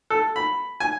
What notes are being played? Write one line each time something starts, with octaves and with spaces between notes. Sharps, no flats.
A4
B5
G#5